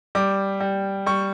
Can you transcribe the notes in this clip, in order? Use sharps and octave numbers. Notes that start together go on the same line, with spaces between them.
G3 D6
G3
G3 C#6